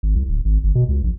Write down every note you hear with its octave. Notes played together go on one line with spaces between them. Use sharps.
G#1
C2
D1
G#1
G1
B2
C#2
A#1